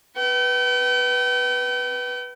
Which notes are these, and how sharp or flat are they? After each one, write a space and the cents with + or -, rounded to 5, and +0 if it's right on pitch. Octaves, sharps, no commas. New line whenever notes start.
B4 -5 G5 -40